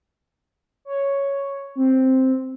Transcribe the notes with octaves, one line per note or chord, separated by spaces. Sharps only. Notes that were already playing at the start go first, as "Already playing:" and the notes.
C#5
C4